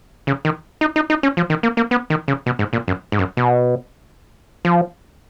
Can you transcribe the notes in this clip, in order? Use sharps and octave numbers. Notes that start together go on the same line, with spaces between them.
C#3
D#3
D#4
D#4
D#4
C#4
F3
D#3
A#3
A#3
B3
D#3
C#3
B2
G#2
A#2
F#2
G#2
F#2
B2
F3